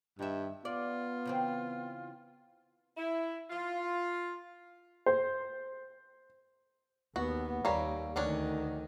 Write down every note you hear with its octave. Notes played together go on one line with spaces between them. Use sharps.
G2 D#3 E5
B3 F4 D5
C#3 E3 C4
E4
F4
C5
D#2 B3 F#4
D#2 G3 A#3 C#5
D2 D#3 F#3 C#4 D4